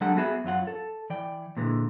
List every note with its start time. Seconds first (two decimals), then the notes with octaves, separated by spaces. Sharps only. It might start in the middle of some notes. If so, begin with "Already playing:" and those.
0.01 F#3 G#3 D4 G4 A4 F#5
0.17 B3 F#4 G#4 E5 B5
0.44 F#2 F#3 F4 F#5
0.67 A4
1.10 E3 D5 G5
1.57 A#2 D3 E3 G#3